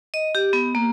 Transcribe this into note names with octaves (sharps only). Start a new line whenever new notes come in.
D#5
G4
B3
A#3